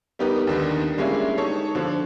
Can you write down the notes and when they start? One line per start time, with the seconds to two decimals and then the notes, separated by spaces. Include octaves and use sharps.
0.19 G3 B3 D#4 G4 A#4 B4
0.47 D#2 D3 D#3
0.97 G3 G#3 A#3 C#4 D4 E4
1.38 D#4 A4 C#5
1.75 D3 F3